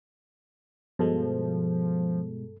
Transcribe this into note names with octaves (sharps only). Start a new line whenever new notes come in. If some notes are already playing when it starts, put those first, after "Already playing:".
G2 B2 F3 G#3 A4